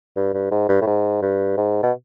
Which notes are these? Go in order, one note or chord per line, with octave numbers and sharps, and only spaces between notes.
G2
G2
G#2
G2
A2
G#2
G2
G#2
B2